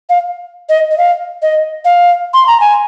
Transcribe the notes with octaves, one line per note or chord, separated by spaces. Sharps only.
F5
D#5
D#5
F5
D#5
F5
C6
A#5
G#5